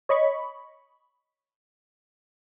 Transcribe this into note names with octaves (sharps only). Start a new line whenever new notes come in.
C#5 D#5 B5 C#6